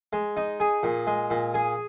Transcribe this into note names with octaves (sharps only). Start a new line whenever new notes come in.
G#3
D#4
G#4
A#2
G#3
A#2
G#4